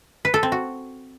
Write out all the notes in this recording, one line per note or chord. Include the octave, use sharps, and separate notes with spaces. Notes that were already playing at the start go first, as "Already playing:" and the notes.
B4
A4
C4
F#4